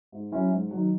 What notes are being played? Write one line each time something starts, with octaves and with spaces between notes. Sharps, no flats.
G#2
F#3 C#4 E4
G#2
D#3 F#3